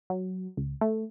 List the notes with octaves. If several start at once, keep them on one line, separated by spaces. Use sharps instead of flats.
F#3
C#2
A3